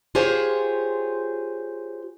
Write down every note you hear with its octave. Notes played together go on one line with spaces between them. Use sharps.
F4 G4 G#4 C5 C#5